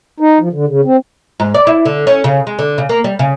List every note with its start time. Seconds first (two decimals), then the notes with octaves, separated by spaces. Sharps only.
0.20 D#4
0.40 F3
0.53 D3
0.68 C#3
0.85 C4
1.40 G#2
1.54 D5
1.67 E4
1.85 D3
2.07 C#4
2.24 C#3
2.47 G#3
2.59 D3
2.78 C#3
2.89 A#3
3.04 G3
3.19 C#3